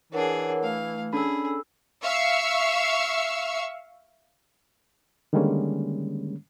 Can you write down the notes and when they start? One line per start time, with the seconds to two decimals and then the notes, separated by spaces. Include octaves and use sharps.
0.13 E3 D4 G#4 A#4 C#5 F#5
0.63 A3 F5
1.13 C#4 D4 G#4 A4 B5 E6
2.04 E5 F5 C#6 E6
5.33 D3 D#3 G3 G#3 A#3 C#4